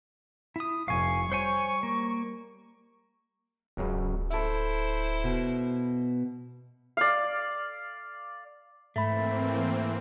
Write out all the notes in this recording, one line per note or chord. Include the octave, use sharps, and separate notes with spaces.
E4 D#6
F1 F5 G#5 C#6
G3 C5 C#5 G#5
A#3
D1 C#2 F#2 C#3
E4 A4 C5 E5
B2
D5 F5
G#2 E3 A3 A#3 C4 B5